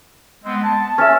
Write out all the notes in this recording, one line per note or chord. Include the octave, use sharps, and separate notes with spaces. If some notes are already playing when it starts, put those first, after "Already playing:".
G#3 B3 C4
A5
C#4 E5